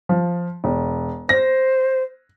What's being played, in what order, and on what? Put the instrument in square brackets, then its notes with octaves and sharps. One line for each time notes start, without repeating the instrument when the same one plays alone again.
[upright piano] F3
E1
[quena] C5 [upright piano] A#6